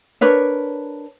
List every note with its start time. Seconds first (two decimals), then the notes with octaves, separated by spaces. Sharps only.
0.21 D4 A#4 B4 C#5